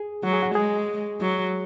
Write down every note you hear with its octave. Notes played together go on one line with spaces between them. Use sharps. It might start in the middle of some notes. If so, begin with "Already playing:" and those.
Already playing: G#4
F#3 F#4
G#4
F#4
G#3 G#4
F#3